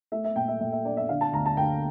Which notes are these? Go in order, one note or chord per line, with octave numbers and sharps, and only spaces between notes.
A3 E5
E5
A#2 G5
E5
A#2 E5
E5
D4 D5
E5
D3 F5
A5
D2 A#5
A5
D2 G5